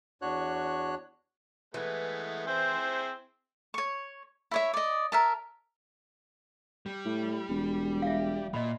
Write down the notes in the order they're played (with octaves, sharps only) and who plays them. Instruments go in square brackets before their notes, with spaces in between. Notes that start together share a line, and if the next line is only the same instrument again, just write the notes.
[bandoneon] E2 D4 F#4 C#5 F#6
[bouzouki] E3 [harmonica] G#3 A3 B3
[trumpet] C4 [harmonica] E4 G#4 C5 [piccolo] G6
[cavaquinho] C#5 C#6
E4 C#5 E5
D5 D#5
A#4 E5 A5
[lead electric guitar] G3
[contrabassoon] A2
E1
[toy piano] E5 F5
[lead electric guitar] A#2 [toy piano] D#5 B5